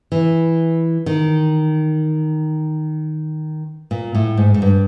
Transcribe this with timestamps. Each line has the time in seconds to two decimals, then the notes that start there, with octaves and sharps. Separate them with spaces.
0.12 E3
1.06 D#3
3.91 A#2
4.15 A2
4.37 G#2
4.54 G#2
4.62 G2